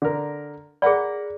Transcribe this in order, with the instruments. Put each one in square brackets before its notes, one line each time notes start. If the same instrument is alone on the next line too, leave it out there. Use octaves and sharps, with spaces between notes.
[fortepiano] D3 A#4
[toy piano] G#4 D5 [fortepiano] A#4 F#5 B5